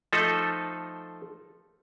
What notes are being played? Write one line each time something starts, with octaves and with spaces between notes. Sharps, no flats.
F3 A3 D#4 A4 C5